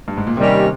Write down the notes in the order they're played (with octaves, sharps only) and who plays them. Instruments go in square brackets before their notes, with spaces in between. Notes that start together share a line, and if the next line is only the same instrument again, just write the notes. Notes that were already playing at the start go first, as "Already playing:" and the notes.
[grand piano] G2
G#2
A#2
[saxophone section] D#2 D#3 G3 C#4 [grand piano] C3